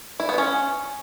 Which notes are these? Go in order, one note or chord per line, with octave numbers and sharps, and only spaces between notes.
E4
B3
C#4